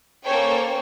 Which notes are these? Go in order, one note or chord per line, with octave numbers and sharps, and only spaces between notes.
A#3 C#4 A4 C5 C#5 G5